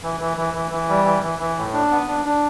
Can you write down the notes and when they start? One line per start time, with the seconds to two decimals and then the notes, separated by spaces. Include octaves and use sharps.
0.03 E3
0.20 E3
0.37 E3
0.54 E3
0.71 E3
0.89 G3
1.05 E3
1.23 E3
1.39 E3
1.57 A2
1.73 D4
1.91 B3
2.08 D4
2.25 D4